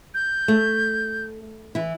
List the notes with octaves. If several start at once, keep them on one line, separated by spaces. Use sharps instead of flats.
G6
A3
E3 E4